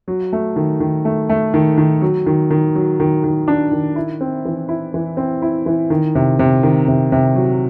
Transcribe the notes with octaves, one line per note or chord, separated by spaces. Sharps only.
F#3
A3
D#3
D#3
A3
A3
D#3
D#3
F#3
D#3
D#3
F#3
D#3
D#3
D4
D#3
E4
C4
E3
E4
E3
C4
E4
E3
D#3
C3
C3
D#3
C3
C3
F#3